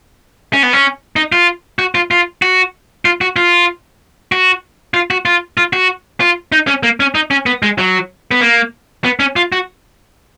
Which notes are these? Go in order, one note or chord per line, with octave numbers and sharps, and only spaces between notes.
C#4
B3
C#4
D#4
F4
F#4
F4
F4
F#4
F4
F#4
F4
F#4
F4
F#4
F4
F4
F#4
F4
D#4
C#4
A#3
C#4
D#4
C#4
B3
G#3
F#3
B3
A#3
B3
C#4
F4
F#4